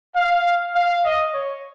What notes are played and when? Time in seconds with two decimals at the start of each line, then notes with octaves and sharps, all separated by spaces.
0.15 F5
0.75 F5
1.05 D#5
1.34 C#5